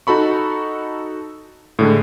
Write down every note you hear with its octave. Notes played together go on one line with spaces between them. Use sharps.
D#4 F#4 A4 B5 C#6
A2 D3 G#3